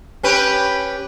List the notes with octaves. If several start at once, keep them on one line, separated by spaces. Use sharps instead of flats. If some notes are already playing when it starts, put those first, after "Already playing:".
C#4 G4 B4